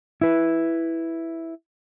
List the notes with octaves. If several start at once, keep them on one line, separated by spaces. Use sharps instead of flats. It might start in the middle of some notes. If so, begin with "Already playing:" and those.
E4 B4